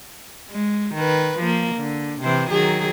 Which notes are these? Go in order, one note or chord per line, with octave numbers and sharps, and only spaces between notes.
G#3
D#3 B4
F3 A#3
D3
C3 E3 C5
D#3 F#3 G#4